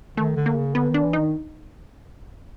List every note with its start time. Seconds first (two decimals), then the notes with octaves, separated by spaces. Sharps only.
0.17 D#3 A3
0.36 D3
0.46 A#3
0.55 C#3
0.74 D3 B3
0.89 D#3
0.94 D4
1.03 E3
1.13 D#3 D#4